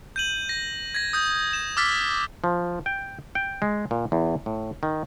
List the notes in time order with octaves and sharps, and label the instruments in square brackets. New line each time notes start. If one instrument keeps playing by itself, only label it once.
[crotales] G6 D#7 F#7
A#6
G#6 A#6
D#6 G6
E7
D6 E6 F6 A6 B6
[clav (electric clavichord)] F3
G5
G5
G#3
A#2
E2
A2
D#3